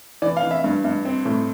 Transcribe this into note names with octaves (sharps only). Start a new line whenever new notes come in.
E3 D5
F5
E3
E5
G2
G2
C4
A2